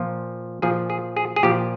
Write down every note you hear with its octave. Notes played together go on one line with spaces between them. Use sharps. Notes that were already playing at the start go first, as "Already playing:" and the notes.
Already playing: A#2 F3
A#2 F3 G#4
G#4
G#4
G#4
A#2 F3 G4